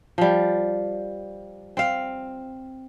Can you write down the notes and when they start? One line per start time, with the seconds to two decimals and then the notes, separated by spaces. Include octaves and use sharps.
0.18 F3 G3
1.77 C4 F5